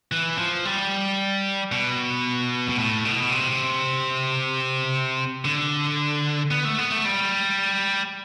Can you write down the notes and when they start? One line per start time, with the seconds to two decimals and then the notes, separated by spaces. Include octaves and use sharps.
0.12 E3
0.38 F3
0.65 G3
1.72 B2
2.69 B2
2.78 A2
3.05 B2
3.32 C3
5.45 D3
6.51 B3
6.65 A3
6.78 B3
6.91 A3
7.05 G3